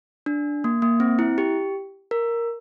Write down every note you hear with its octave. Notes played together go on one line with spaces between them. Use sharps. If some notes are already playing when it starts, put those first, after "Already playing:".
D4
A#3
A#3
C4
E4
G4
A#4